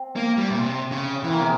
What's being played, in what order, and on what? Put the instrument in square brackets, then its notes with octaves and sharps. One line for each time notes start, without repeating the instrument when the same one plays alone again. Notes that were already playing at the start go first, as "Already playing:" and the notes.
Already playing: [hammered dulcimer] C4
[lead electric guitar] A#3
G3
A#2
C3
C#3
[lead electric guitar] E3 [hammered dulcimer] C4
[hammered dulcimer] A#3
[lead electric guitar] C3 [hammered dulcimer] G#3